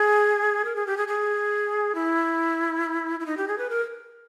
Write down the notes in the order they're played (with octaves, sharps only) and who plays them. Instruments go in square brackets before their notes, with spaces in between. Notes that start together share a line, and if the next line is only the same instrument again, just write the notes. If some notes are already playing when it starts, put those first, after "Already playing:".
Already playing: [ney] G#4
A#4
G#4
G4
G#4
G#4
E4
E4
D#4
G4
G#4
B4
A#4